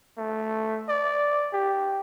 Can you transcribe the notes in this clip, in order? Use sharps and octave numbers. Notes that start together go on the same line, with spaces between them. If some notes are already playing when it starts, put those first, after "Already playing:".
A3
D5
G4